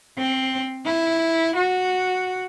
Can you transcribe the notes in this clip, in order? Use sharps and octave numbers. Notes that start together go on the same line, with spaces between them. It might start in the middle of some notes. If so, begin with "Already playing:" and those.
C4
E4
F#4